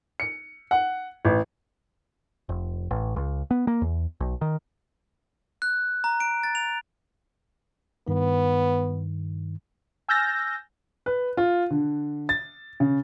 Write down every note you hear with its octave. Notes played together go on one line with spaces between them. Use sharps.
C#7
F#5
A1
F1
A1
C#2
B3
A#3
E2
B1
D#3
F#6
A#5
D7
A6
F7
G2 D#3 B3
G#5 E6 F6 G6 A6 A#6
B4
F4
D3
A6
C#3